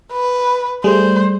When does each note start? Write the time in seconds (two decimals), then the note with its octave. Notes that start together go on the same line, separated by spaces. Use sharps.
0.12 B4
0.84 G3 A3 G#4 C5